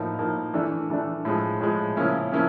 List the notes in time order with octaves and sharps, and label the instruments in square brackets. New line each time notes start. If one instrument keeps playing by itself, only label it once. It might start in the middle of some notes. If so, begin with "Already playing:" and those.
Already playing: [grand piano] A2 F3 A#3 D#4
A2 F3 A#3 D#4
E3 A3 D4
E3 A3 D4
A2 F3 G#3
A2 F3 G#3
C#3 F3 A#3 C#4 E4
C#3 F3 A#3 C#4 E4